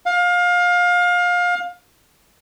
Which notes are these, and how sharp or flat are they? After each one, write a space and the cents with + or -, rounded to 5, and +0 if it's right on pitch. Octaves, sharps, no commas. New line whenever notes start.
F5 +25